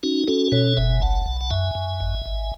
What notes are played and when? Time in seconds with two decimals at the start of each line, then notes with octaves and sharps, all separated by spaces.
0.03 C#4 D#4 F#4
0.27 C#4 F#4 A4
0.52 B2 A4 C#5
0.77 F#1 E5 G#5
1.01 B1 F#5 A5
1.26 B1
1.41 F#5
1.50 F#2 E5 G#5
1.75 F#2
2.00 G#1
2.26 G#1